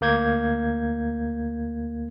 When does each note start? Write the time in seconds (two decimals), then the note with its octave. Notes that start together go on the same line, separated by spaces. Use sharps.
0.01 D2 A#3 G6 G#6